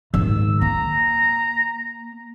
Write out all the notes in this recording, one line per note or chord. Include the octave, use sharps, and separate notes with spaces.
G#2 D#3 E6
A#3 A#5